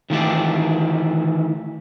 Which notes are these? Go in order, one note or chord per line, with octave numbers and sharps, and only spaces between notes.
D#3 E3 A3 F4 G4 D5